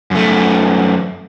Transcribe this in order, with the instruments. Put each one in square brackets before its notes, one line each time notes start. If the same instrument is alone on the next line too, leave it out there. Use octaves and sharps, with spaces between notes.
[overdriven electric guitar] F#2 A3